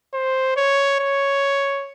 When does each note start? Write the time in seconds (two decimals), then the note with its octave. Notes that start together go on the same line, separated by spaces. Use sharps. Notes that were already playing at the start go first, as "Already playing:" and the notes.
0.14 C5
0.57 C#5
1.00 C#5